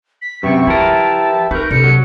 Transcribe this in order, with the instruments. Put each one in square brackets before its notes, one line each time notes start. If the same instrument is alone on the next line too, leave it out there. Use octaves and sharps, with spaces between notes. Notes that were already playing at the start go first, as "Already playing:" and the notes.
[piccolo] B6
[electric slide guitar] F#2 C3 [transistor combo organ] G4 B4 E5 [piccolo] C#6
[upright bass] F3 [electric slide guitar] E4 A#4 [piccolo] A5
[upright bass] D#4 [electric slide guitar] A#4 B4 [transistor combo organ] C#6 [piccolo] G6
[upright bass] C3 [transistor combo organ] D4 A4 [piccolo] C#7
[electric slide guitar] F#3